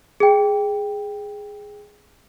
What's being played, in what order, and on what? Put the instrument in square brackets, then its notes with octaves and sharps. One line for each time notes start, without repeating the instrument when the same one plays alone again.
[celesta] G#4 G5